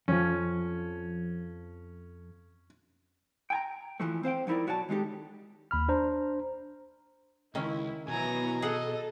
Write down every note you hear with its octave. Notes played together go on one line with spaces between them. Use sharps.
F2 F3 C#4
G5 G#5 A#5
F2 E3 F3 A3
C4 C5 F5 G5
F3 D#4 E4 A#4 D5
B1 F#4 C#5 D5 G5 A5
D#3 G#3 D#4 G4 A4
D#2 B5 F6
D4 C5 A#5
C#2 D#3 C#4 E4
B2 E3 F#3 B3 G#5 A#5
G#4 A4 D#5 F#5